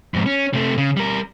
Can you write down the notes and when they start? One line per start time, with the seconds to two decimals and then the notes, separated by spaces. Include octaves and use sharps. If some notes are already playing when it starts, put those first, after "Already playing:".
0.14 F2 G#2
0.26 C#4
0.54 C3 A3
0.78 C#3
0.97 G3 A#4